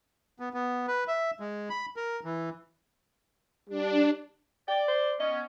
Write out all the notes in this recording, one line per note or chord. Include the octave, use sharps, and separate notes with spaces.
B3
B3
B4
E5
G#3
B5
A#4
E3
G3 D4
D5 G5
C5
B3 C#4 D#5